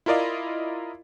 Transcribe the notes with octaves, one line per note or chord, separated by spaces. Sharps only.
E4 F4 A#4 D5 D#5 F5